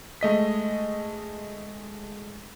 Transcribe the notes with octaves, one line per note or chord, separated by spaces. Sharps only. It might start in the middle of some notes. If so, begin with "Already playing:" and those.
G#3 A3 D#5 B6